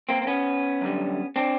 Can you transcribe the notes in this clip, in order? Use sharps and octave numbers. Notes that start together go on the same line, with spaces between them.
A#3 C4
C4
B3 C#4
F#2 D3 G3
C4 D4